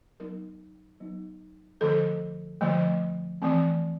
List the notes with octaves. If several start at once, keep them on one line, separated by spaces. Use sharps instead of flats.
F#3 B3 D#4 A#4
F#3 B3 D#4
D3 F3 A3 A4
D3 F3 A3
E3 A3 C4